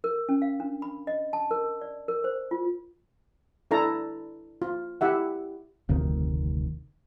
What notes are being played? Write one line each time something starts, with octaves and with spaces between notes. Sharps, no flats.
A#4
C#4
F5
D4
B5
D#5
A5
A#4
D5
A#4
C5
F4
D4 E4 A4 A5 A#5
F4
E4 G4 E5 F#5
F1 D2 C3 D#3